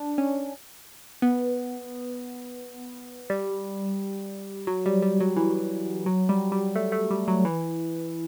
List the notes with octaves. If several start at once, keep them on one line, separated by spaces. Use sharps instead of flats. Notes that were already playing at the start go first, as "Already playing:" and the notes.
Already playing: D4
C#4
B3
G3
F#3
G3
G3
F#3
E3
F#3
G3
G3
A3
A3
G3
F#3
E3